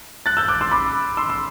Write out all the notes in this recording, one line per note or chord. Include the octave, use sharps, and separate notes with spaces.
F#6 A6
E6 G6
D6 F#6
C6 E6
B5 D6
C6 E6
C6 E6